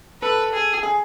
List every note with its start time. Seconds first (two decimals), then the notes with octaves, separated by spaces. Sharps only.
0.22 A4 B4
0.53 G#4
0.83 G#4